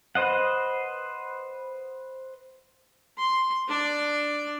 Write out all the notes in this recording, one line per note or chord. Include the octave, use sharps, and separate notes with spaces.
B4 C5 D#5 F#5
C6
D4 D5